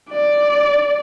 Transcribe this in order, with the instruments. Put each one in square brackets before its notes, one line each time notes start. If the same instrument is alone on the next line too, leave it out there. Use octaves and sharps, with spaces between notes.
[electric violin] D5